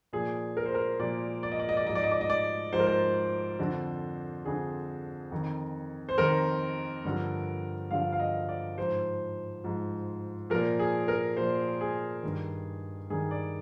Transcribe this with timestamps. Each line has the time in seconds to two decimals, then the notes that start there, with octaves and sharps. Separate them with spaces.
0.13 A#2 F3 G#4
0.57 A#4
0.66 C5
0.75 A#4
0.99 A#2 F3 D5
1.43 D5
1.52 D#5
1.59 D5
1.69 D#5
1.77 D5
1.86 G#2 F3 D#5
1.95 D5
2.04 D#5
2.12 D5
2.21 D#5
2.30 D5
2.73 G#2 F3 C5
2.79 A#4
2.87 C5
3.59 F2 D3 F3
4.45 F2 D3 F3 G#4
5.32 F2 D#3
6.09 C5
6.18 F2 D#3 A#4
7.05 G2 D3 F3
7.91 G2 D3 F3 F5
8.13 F5
8.20 D#5
8.49 D5
8.78 G#2 F3 C5
9.64 G#2 F3
10.50 A#2 F3 A#4
10.79 G#4
11.08 A#4
11.37 A#2 F3 C5
11.81 G#4
12.23 G2 D#3
13.10 G2 D#3 G#4
13.31 D5